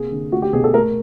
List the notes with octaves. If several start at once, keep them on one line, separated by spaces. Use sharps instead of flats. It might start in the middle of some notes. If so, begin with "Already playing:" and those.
Already playing: C3 A#3 G#4
D3
A3 F#4
G4
B2 G#4
A4
A3 A#4